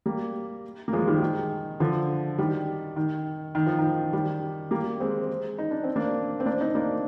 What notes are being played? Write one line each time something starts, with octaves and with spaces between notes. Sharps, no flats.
G3 A#3
A#3
F3 G#3
D#3 G3
D#3
D3 F3
D#3 G3
D#3
D#3
F3
D#3
D#3 G3
G3 A#3
G#3 C4
D#4
D4
C4
A#3 D4
C4
A#3 D4
C4 D#4
A#3 D4